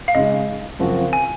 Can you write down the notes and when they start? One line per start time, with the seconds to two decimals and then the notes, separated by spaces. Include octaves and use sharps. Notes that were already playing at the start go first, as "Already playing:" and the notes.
0.08 F5
0.15 C#3 G#3 D#4 D#5
0.79 F#2 C#3 F3 C4 F#4
1.13 G#5